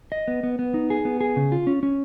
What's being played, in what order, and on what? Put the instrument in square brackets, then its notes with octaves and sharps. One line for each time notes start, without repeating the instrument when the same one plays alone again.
[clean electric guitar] D#5
B3
B3
B3
D#4
G#4
B3
G#4
C#3
F4
C#4
C#4